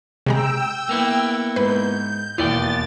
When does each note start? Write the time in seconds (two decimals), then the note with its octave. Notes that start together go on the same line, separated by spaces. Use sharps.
0.26 C3 G#3 G5 A#5 E6
0.89 A#3 B3 E4
1.56 G#2 B4 G6
2.38 E1 D#2 E3 B3 E4 D5 G5 A6